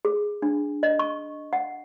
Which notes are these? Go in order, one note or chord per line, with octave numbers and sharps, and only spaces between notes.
G#4
D4
D#5
C#6
F#5